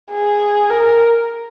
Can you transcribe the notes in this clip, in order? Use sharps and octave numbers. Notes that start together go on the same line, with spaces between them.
G#4
A#4